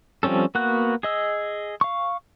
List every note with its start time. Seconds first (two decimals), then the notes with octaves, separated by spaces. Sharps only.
0.23 F3 G3 C4 C#4 A4
0.55 A#3 B3 F#4 F#5 F#6
1.03 G#4 D#5 E6
1.81 F5 C#6